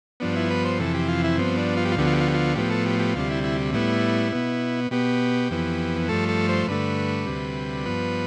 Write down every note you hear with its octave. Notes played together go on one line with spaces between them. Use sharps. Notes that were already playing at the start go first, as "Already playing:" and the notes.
G2 F3 B3 D4
E4
B4
C5
F2 C3 E3 A4
G4
F4
E4
G2 F3 B3 C4
D4
F4
G4
F4
D2 D3 F3 B3 G4
F4
G4
F4
G4
F4
A2 F3 B3 G4
A4
G4
G4
D2 C3 G3 F4
E4
E4
A2 G3 B3 E4
B2 B3
B2 B3 G4
F2 E3 B3
G2 F3 A3 A4
A4
C5
G2 D3 A3 B4
D2 C3 G3
G2 F3 B3